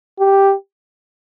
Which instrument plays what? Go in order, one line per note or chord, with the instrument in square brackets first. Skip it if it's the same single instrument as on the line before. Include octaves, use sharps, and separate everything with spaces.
[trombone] G4